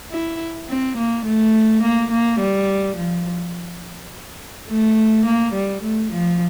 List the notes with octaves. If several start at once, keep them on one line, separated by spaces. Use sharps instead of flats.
E4
C4
A#3
A3
A#3
A#3
G3
F3
A3
A#3
G3
A3
F3